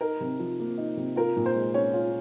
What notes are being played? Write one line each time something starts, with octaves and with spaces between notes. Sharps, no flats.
D#4 A#4
C3
F3
A#3
D#4
C3
F4 A#4
A#2
C5
G#3
C#4 C#5
F4